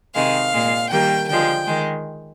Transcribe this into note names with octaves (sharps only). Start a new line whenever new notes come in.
C3 D#3 G#3 F5
A#2 G#3
D#3 G3 A#3 G5
D3 F3 G#3 G5
D#3 G#3